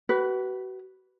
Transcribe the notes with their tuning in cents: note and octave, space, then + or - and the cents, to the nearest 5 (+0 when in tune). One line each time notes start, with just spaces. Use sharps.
F#4 +35 B4 +0